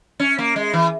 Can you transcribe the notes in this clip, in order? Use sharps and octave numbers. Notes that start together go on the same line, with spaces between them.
C#4
A#3
G#3
E3